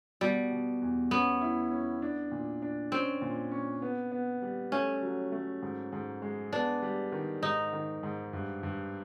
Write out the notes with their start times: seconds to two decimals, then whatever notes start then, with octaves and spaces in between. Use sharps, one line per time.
0.21 B2 G3
0.51 B2
0.82 E2
1.11 B3 C#4
1.41 E4
1.71 C#4
2.02 D4
2.31 A#2
2.62 D4
2.92 C4 C#4
3.22 A#2
3.52 C#4
3.82 B3
4.12 B3
4.42 G3
4.72 A3 C#4
5.02 F#3
5.32 A3
5.62 G#2
5.92 G#2
6.22 G#3
6.53 B3 D4
6.82 G3
7.12 D#3
7.43 G#2 D#4
7.73 D#3
8.03 G#2
8.33 G2
8.63 G2